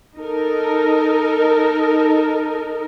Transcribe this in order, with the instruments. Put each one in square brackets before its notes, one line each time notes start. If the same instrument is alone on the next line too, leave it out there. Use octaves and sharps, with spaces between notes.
[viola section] D#4 A4 A#4